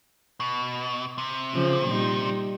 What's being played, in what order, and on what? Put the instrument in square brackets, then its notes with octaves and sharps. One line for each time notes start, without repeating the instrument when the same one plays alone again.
[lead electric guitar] B2
C3
[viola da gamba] C#3 F3
A#2 G3 D#4